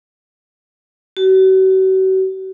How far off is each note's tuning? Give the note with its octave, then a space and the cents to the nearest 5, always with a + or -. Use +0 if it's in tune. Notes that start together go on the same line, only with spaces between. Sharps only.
F#4 +40